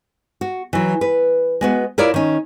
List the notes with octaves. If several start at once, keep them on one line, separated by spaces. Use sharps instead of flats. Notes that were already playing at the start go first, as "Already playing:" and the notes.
F#4
E3 F#3
B4
G#3 B3 F#4
E4 F4 A#4 C#5 D5
D#3 C#4